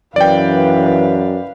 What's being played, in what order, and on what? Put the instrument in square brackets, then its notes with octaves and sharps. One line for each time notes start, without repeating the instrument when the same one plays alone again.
[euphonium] F#2 [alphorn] E3 [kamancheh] B4 F5 [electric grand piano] D5 G5